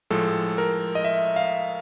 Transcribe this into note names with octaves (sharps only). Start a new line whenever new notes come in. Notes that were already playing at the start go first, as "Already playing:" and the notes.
A2 F3 G#3 A4
A#4
D#5
E5
F5